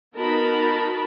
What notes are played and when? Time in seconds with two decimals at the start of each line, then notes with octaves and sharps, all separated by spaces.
0.15 B3 D#4 F#4 A#4 A5 B5